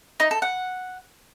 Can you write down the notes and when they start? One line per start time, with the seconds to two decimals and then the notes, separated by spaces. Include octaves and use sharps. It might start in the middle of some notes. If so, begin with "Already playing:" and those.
0.20 D#4
0.31 A4
0.42 F#5